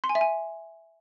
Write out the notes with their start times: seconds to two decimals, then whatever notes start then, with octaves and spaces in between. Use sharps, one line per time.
0.04 C6
0.09 G#5
0.15 E5
0.21 G#5